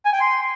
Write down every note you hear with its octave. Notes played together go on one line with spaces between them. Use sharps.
G#5
G5
C6